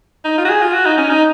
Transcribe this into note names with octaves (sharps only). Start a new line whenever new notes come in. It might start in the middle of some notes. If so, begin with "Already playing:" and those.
D#4
F4
F#4
G#4
F4
F#4
D#4
C#4
D#4